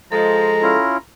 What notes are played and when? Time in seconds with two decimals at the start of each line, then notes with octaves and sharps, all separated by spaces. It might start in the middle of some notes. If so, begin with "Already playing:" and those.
0.12 F3 G#3 A4 A#5
0.62 C#4 E4 F4